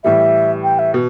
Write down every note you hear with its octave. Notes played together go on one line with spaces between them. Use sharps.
A2 E3 G3 E5
G5
E5
B2